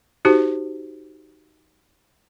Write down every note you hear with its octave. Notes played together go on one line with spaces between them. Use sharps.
D#4 F#4 G4 C5